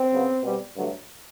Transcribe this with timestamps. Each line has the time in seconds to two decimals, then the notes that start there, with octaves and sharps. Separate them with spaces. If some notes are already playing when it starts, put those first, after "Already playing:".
Already playing: C4
0.11 C#3 F#3 B3
0.42 B2 G3 C4
0.74 G2 D3 F#3 A3